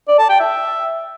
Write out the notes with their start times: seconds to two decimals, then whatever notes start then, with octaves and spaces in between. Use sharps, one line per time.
0.08 D5
0.19 A5
0.29 G5
0.40 E5